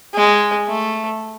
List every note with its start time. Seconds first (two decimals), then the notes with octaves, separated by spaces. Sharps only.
0.15 G#3
0.68 A3